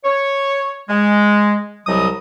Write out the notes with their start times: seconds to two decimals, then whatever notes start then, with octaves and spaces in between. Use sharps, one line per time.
0.04 C#5
0.89 G#3
1.86 C2 F#3 G3 D#5 D#6